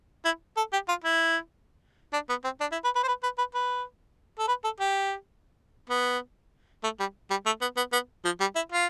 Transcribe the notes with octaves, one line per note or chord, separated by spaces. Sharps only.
E4
A4
G4
F4
E4
D4
B3
C4
D4
E4
B4
B4
C5
B4
B4
B4
B4
A4
B4
A4
G4
B3
A3
G3
G3
A3
B3
B3
B3
F3
G3
E4
F4